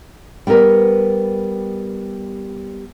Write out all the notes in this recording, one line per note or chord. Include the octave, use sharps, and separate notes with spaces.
G3 B3 G4 A#4 B4